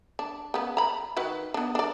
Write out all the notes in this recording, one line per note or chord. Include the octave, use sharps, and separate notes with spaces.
D4
C#3 B3
A#5 B5
D#3 F#4 B4
B3 D4
D4 D5